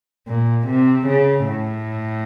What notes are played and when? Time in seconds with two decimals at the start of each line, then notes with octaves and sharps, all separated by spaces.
0.28 A#2
0.67 C3
1.06 C#3
1.45 A2